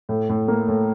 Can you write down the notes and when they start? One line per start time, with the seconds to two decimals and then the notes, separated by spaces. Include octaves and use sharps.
0.09 A2
0.29 A2
0.48 A#3
0.68 A2